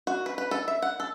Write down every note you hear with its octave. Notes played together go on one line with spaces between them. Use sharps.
F#4
B4
B4
A4
E5
F#5
A4